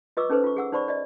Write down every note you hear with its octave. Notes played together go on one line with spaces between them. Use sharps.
F4 B4 D#5 C#6 D6 E6
C#4 D#4 A4 B4 C5
F4 C#6
G#4 F#5 E6
D#4 C5 D5 B5 C#6
D5 D#5